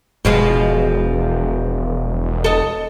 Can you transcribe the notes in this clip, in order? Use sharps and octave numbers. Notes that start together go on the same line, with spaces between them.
E1 B2 F3 G#3
A4 D#5